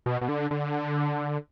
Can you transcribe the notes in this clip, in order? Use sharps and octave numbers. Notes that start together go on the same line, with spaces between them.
B2
B2
D3
D3